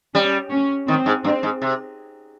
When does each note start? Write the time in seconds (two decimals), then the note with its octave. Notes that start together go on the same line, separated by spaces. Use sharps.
0.14 G3 C#4
0.51 C#4
0.88 D#3 C4
1.06 G#2
1.24 G2 C4
1.43 G#2
1.62 C3